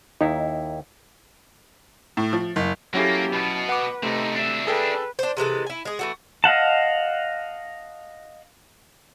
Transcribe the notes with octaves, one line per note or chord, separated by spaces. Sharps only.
D#2 D#4 E4
A2
F3
F#1
F#3 A#3 C#4 E4 G4 A4
B2 B3 A5
B4 F#5 D6
C3 A3 C4 D#4
C4 D4 E5
G#4 A4 B4 G5
D4 C5
C3 E3 G#3 A4
E4 G#5
G#3 G#4
E3 A3 F#4
D#5 F5 F#5 A5